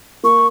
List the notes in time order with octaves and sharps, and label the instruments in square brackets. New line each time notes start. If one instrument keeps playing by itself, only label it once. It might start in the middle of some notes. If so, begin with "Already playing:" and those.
[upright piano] A#3 [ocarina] C#6